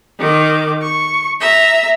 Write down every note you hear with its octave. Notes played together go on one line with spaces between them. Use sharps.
D#3 D6
C#6
E5 A#5